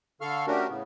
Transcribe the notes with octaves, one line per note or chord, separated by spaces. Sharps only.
D3 A4 F5 C#6 F6
A3 C#4 D4 F#4 G4 A#4
A2 C#3 B3